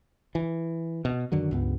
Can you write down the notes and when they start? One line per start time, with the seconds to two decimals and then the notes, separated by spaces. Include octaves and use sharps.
0.35 E3
1.05 B2
1.32 F#2 D3 D#3 F#3
1.51 C#2 G2 B3